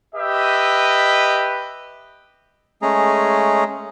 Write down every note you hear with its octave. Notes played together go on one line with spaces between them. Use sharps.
G4 B4 D#5 E5
G#3 A3 C#4 G#4 A#5